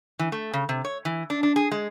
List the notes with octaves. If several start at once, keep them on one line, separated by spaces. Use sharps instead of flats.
E3
A3
C#3
C3
C#5
E3
D4
D4
G#4
G#3